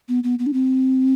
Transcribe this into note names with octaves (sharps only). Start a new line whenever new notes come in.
B3
B3
B3
D4
C4